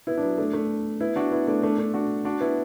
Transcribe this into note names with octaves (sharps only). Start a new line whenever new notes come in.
B3 E4
D4
F#3 B3
A3 D4
A3 D4
B3 E4
D4 F#4
B3 E4
A3 D4
A3 D4
A3 D4
D4 F#4
D4 F#4
B3 E4